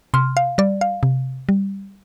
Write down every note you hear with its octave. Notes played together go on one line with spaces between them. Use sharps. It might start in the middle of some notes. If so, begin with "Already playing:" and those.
C3 C6 F6
F5
G3 D5
F5
C3
G3